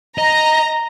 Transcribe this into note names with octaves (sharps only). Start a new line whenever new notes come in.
D#5 A#5